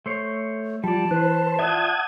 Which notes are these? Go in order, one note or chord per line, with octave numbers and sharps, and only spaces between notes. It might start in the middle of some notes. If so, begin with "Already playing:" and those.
A3 C5 C#5
F3 G3 D5 A5
E3 B4 C5 F#6
F4 D5 E5 F#5 D#6 G#6